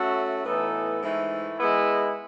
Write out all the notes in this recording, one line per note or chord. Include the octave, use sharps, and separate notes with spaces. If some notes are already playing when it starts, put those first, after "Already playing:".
Already playing: A3 C#4 F#4 A4 E5
A2 E3 B3 D#4 A4
G#2 E3 A3
G#3 B3 E4